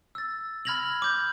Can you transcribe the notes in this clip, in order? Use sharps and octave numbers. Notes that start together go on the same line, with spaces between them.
E6 A6
B5 F6 G#6 A#6 F7 F#7
D6 G6